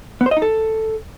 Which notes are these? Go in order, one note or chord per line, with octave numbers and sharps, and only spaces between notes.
B3
C5
D#5
D#4
A4